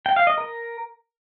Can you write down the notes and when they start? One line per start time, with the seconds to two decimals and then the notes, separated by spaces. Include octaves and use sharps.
0.06 G5
0.16 F5
0.27 D#5
0.38 A#4